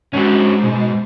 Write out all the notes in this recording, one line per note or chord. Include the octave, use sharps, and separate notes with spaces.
D#2 G#2 C#4 D4 F#4
B2